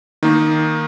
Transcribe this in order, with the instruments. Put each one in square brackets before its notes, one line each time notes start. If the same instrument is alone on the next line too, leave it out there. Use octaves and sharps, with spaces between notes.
[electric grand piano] D#3 A#3 D#4